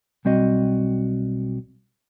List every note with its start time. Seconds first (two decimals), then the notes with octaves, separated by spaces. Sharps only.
0.25 B1 G3 C4 F#4 D#5